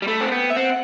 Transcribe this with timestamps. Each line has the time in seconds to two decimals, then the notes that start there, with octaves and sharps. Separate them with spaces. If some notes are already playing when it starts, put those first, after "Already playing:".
0.02 G3
0.07 A3 B5
0.21 C4 F#5
0.31 B3 G5
0.50 E5
0.56 C4 F#5